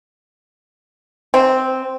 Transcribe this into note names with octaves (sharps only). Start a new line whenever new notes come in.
C4